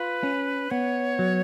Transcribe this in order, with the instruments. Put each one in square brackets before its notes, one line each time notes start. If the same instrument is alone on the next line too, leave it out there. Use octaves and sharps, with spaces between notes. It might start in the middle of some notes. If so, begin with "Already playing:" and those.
Already playing: [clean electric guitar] F4 [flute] B4
[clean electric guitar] C#4
[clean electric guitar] B3 [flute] C#5
[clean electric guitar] F#3